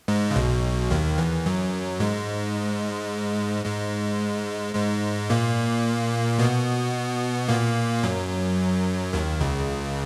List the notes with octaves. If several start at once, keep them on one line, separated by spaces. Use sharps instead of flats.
G#2 G#3
C#3
B1 B2
D#2 D#3
E2 E3
F#2 F#3
G#2 G#3
G#2 G#3
G#2 G#3
A#2 A#3
B2 B3
A#2 A#3
F#2 F#3
D#2 D#3
C#2 C#3